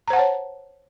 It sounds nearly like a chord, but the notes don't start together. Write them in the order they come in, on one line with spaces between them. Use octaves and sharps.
A#5 C5 F#5 A5 C#5